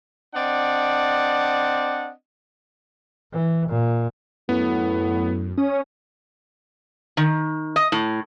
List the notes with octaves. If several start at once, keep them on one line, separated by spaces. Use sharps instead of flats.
C4 D4 D5 D#5 F#5
E3
A#2
F#2 A2 B3
C#4 D#6
D#3
D#5
A2